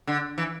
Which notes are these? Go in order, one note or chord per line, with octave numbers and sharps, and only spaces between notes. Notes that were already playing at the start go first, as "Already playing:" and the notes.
D3
E3